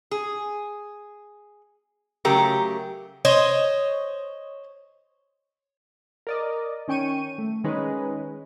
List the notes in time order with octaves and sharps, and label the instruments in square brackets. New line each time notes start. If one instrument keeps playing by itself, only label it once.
[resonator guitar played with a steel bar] G#4
C#3 F#3 A3 G4 A#4
[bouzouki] C5 C#5 D#5
[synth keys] A#4 D5 D#5
D#3 C#4 G5 C#6 D#7
A3
D#3 G#3 C#4 D#4 B4